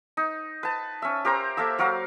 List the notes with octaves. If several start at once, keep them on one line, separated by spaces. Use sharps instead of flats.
D#4
B4 A5
C#4 E5
G4 A#4 C5 A#5
A#3 A4 E5 E6
F#3 F#4 A#4 F5